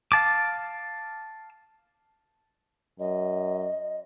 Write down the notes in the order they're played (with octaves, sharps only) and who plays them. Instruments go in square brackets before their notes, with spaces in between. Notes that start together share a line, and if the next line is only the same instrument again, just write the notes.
[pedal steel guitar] F5 A5 D6
[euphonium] F#2 [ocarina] D#5